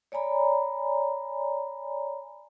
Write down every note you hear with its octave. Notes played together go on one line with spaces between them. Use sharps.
C#5 D5 G#5 A#5 B5